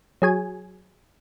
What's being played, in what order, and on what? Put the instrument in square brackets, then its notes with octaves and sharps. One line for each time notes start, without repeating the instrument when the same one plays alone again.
[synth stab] F#3 G#4 G#5